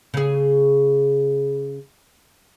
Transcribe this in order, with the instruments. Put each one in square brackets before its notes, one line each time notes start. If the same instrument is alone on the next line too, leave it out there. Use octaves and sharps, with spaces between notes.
[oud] C#3 G#4